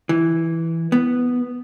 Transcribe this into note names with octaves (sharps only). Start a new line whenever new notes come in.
E3
B3